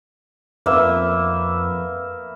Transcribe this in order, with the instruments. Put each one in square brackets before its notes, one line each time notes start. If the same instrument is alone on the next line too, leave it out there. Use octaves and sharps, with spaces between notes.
[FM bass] F2 [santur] A#3 B3 E5